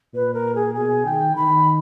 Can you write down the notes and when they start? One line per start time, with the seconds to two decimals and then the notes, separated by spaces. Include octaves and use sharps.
0.14 A#2 B4
0.34 A#4
0.55 G#4
0.74 B2 G#4
1.05 D#3 G5
1.35 D#3 B5